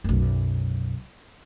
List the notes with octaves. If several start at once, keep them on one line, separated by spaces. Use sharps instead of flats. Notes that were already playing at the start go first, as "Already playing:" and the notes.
B1 F#2